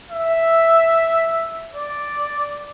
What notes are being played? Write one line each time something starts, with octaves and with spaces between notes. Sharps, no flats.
E5
D5